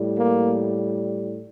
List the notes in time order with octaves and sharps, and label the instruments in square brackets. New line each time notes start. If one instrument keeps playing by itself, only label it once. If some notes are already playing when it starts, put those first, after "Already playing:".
Already playing: [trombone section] A2 G3
A#3